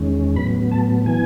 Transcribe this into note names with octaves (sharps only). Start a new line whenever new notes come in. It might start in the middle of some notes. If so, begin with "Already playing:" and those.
Already playing: E2 D#3 G#3 C#4
A2 F#3 B3 B5
A5
E3 B3 G#5